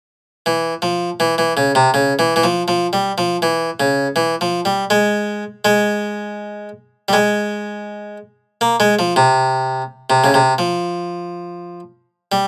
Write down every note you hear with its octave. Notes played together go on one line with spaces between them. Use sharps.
E3
F3
E3
E3
C#3
C3
C#3
E3
E3
F3
F3
G3
F3
E3
C#3
E3
F3
G3
G#3
G#3
G3
G#3
A#3
G#3
F3
C3
C3
C#3
C3
F3
G3